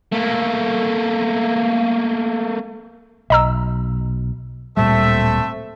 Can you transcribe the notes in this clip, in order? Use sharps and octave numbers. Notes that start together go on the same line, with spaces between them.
A3 A#3
B1 D#5 A#5 E6
D1 A#2 G3 A3 C4 E5